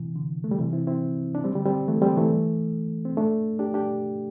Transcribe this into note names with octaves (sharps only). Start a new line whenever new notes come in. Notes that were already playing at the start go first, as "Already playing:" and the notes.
Already playing: C3 E3
D3
A3
G3
C3 E3
C4 E4
C4 E4
D4
G3 C4
D3 G3
G3 C4
E3 A3
G3 C4
E3 A3
C4
A3 D4
D4 G4
D4 G4